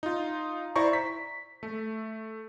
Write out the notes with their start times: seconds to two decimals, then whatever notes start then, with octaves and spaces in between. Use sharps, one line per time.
0.03 D#4 F4
0.76 E4 C5 D5 A#5 C#6
0.93 B6
1.63 A3